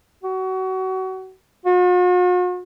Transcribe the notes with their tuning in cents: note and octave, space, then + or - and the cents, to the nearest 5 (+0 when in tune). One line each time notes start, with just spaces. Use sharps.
F#4 +30
F#4 -45